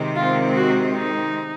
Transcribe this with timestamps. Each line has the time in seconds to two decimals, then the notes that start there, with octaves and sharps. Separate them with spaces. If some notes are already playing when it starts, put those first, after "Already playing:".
Already playing: C3 D#3 G#3 C4
0.16 F4
0.56 F#4
0.94 D#4